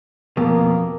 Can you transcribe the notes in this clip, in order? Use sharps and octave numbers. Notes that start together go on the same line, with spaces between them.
F2 B2 A#3